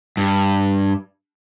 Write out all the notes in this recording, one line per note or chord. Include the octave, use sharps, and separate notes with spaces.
G2